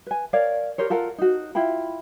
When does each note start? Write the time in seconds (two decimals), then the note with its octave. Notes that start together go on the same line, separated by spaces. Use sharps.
0.07 B4 G#5
0.33 A#4 C#5 D5 F5
0.78 G4 A#4 C5 C#5
0.90 F4 A4 A#4 F#5
1.18 D#4 F#4
1.55 E4 F4 G5 B5